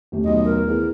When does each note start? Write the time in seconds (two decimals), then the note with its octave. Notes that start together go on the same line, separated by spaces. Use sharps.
0.12 D#1 A3 G4
0.24 B1 D#5
0.45 A#4
0.67 E2